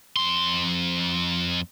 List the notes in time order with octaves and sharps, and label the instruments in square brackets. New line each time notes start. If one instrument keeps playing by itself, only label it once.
[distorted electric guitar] F2 C6